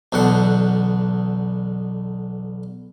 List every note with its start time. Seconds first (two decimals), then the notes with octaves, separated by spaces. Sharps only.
0.12 B1 E2 D3 F#5